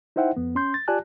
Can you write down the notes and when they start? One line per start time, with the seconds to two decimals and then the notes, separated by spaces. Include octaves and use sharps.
0.16 D#4 E4 C5 E5 F#5 G5
0.37 F2 B3
0.55 C#4 C6 G6
0.74 A6
0.88 F4 G4 D5 G#5 A5 F#6